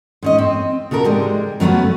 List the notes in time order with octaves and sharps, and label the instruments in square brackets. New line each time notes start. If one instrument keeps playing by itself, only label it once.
[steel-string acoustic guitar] G#2 C#4 D#5
C4
C#3 F#4 A4 A#4
G#2 G3 G#3
C#3 F#3 A3 B3 C#4